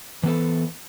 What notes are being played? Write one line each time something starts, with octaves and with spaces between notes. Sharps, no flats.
E3 B3 A4